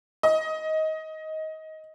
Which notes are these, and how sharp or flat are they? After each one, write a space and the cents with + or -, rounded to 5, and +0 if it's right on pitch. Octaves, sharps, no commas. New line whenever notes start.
D#5 +15